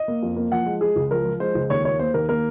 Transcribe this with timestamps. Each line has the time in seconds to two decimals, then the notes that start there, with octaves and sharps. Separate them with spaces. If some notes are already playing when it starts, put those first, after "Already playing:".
Already playing: D#5
0.08 A#3
0.23 F2
0.36 A#3
0.52 F3 F#5
0.66 G#3
0.81 G#3 G#4
0.96 C#2
1.11 F3 A#4
1.25 F3
1.40 G#3 C5
1.55 C#2
1.70 D#2 C#5
1.85 A#3 C#5
1.99 A#3 C5
2.14 D#2 A#4
2.29 A#3 A#4